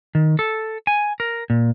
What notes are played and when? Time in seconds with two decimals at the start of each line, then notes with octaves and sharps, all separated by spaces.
0.15 D#3
0.39 A4
0.87 G#5
1.20 A#4
1.50 A#2